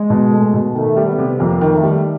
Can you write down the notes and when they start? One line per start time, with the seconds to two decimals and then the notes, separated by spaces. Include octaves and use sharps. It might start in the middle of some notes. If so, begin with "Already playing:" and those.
Already playing: G#3
0.10 B2
0.32 A3
0.53 B2
0.75 D#3 A3
0.97 G3
1.07 B3
1.19 C3
1.40 F2 A#3
1.61 D#3
1.72 A3
1.83 G3